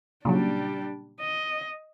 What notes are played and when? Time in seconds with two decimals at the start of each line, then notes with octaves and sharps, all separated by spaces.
0.25 A#2 C#3 F#3 G3 D4
1.20 D#5